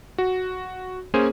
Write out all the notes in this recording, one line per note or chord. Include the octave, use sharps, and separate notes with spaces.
F#4
A#3 C#4 G#4 C5 G#5